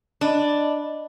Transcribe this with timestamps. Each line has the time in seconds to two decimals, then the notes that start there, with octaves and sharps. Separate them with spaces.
0.21 D4 D#5 B5